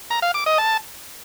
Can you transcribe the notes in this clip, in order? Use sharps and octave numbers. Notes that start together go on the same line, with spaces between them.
A#5
F5
D6
D#5
A5